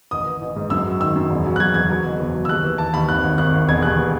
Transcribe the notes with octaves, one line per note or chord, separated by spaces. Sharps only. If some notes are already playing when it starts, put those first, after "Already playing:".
A1 D#6
E3
A1
G#2
F#2 E6
F#3
D#3 E6
F#2
E1
F#3
F#6
F#3 G#6
E2 G#6
F#3
F#1
E2
F#3
E6
D#2 F#6
E3
E3 A5
D#2 B5
G#1 F#6
G#1
G#1 F#6
G#1
E1 G#6
D#2 F#6
E3